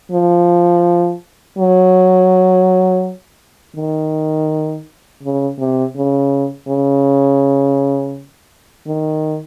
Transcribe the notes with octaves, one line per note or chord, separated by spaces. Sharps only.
F3
F#3
D#3
C#3
C3
C#3
C#3
D#3